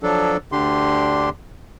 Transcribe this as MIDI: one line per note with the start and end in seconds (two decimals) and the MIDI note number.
0.03 0.37 53
0.03 0.37 54
0.03 0.37 62
0.03 0.37 69
0.52 1.29 38
0.52 1.29 50
0.52 1.29 62
0.52 1.29 67
0.52 1.29 84